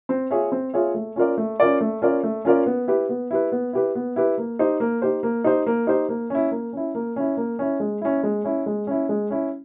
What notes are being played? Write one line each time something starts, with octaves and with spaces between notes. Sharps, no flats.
C4
F4 G#4 C#5 E5
C4
F4 G#4 C#5 E5
A3
C#4 F4 A#4 D5
A3
C#4 F4 A#4 D5
A3
C#4 F4 A#4 D5
A3
C#4 F4 A#4 D5
B3
E4 G4 B4
B3
E4 G4 B4
B3
E4 G4 B4
B3
E4 G4 B4
A#3
D#4 G4 C5
A#3
D#4 G4 C5
A#3
D#4 G4 C5
A#3
D#4 G4 C5
A#3
C#4 E4
A#3
C#4 E4
A#3
C#4 E4
A#3
C#4 E4
G#3
C#4 E4
G#3
C#4 E4
G#3
C#4 E4
G#3
C#4 E4